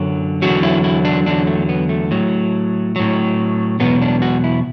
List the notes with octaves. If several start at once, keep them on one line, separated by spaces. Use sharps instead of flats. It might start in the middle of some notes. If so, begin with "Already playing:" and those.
Already playing: F#2 D3 F#3
E2 D3 F#3 F#4
E4
E4
D4
E2 D3 F#3 D4
A3
B3
A3
A2 F#3
A2 F#3
E2 B2 F#3 B3
D4
F#4
E4